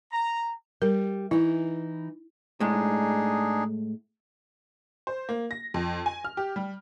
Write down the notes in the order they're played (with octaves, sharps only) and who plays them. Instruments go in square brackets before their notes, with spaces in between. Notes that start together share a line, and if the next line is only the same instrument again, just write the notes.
[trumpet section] A#5
[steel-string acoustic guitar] G3 [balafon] A#4
[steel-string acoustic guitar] E3 D#4 [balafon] E4
[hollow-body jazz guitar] A2 G#3 [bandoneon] D4 D#4 G#4
[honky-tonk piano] C5
A#3
A#6
F2
G#5
F6
G4
G3